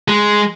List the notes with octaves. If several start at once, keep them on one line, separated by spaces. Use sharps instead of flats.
G#3